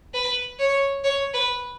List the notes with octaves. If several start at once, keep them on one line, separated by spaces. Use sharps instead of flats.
B4
C#5
C#5
B4